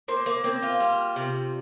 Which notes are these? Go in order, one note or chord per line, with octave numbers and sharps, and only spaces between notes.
A#3 C5
A#3
A#3 C4
F4
G3
C3